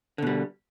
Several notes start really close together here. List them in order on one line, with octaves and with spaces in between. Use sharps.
D3 B2 G3